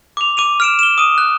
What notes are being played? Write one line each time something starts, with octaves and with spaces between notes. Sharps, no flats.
D6 F7
D6 D#7 F7
F6 D7 E7
E7 G7
D#6 D#7
F#6